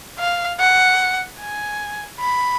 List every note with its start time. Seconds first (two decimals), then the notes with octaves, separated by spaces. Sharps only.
0.19 F5
0.59 F#5
1.40 G#5
2.20 B5